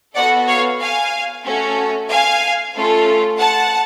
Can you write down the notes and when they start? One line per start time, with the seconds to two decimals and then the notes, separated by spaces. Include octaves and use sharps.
0.15 B3 F#4 A4 D5 F#5
0.48 C#5 F5
0.80 F5 G#5
1.45 A3 C#4 F#4 A4
2.09 F5 G#5
2.75 A3 C#4 F4 A4
3.39 F#5 A5